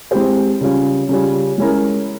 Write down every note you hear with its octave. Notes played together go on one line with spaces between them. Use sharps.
G#3 C4 E4 G4 C5
C#3 G3 C#4 F4
C#3 G3 C#4 F4
G#3 C#4 E4 A#4